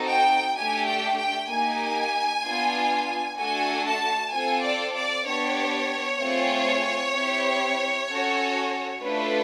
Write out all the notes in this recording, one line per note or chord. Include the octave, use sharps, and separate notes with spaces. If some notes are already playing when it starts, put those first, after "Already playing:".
Already playing: C4 D#4 F#4 A4
G5
A3 D4 G4 G#5
G5
G5
A#3 D#4 G4 G#5
B3 D4 F4
A3 D4 F#4 A4 G#5
A5
C4 F4 A4 G#5
D5
D5
B3 D4 G4 C#5
A3 C4 F4 G#4
C4 E4 G4
C#4 F#4 A4
A3 D4 F4 A4 B4